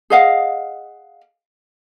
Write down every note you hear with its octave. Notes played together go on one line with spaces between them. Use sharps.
G#4 D#5 F5 F#5